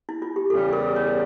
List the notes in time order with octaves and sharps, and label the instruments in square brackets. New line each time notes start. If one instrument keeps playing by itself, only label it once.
[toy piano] E4
F4
G4
[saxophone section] E2 C#3 G3 [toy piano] A4
[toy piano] A#4
C#5